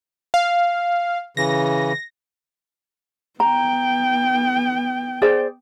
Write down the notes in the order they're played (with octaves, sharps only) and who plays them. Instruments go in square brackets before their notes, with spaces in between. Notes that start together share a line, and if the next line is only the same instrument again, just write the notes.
[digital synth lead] F5
[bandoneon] C#3 E3 [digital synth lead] A#6
[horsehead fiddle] B3 G5 [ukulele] A#5
[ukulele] G#4 C5 D5